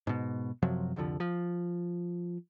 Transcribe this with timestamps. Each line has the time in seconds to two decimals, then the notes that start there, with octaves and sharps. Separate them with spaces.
0.07 G#2 B2
0.62 F#2 C3 F3 F#3
0.96 C2 F2 D3 F3
1.20 F3